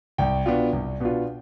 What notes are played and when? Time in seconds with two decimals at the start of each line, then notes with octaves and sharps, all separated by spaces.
0.18 C2 G5
0.46 B2 B3 D4 F4
0.73 C2
1.00 B2 B3 D4 F4